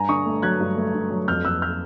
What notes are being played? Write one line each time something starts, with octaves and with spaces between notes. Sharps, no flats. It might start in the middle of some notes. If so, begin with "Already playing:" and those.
Already playing: G2 G#5 A#5
D3 C#6 D#6
A3
F#3 F#6 G#6
G2
A3
G2
F#3
F2 F6 G6
F2 E6 F#6
F6 G6